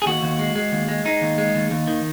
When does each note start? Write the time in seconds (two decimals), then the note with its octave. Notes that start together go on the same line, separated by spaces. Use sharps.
0.02 G#4
0.06 D#2 F#4
0.23 D#2
0.39 G#3
0.56 G#3
0.72 D#2
0.88 G#3
1.05 G#3 D#4
1.21 D#2
1.38 G#3
1.55 D#2
1.71 D#2
1.88 D#3